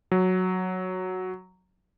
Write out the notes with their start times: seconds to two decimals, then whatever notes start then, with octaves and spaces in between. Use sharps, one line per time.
0.11 F#3